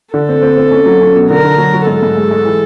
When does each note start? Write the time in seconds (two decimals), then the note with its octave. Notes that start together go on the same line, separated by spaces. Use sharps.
0.14 D3 A4
0.29 C4
0.43 C4
0.57 C4
0.71 C#4
0.86 F#3
1.01 C#4
1.15 B2
1.30 D3 A#4
1.44 D3
1.58 F#3
1.74 F#3
1.87 G#2 A4
2.03 G#2
2.17 G#3
2.31 G#3
2.45 E3